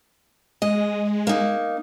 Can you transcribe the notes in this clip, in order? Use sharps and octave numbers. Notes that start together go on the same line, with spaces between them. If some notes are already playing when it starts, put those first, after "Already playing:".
G#3 D#5
A#3 D#4